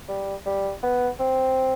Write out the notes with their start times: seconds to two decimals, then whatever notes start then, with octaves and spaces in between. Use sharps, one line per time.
0.09 G3
0.46 G3
0.83 B3
1.20 C4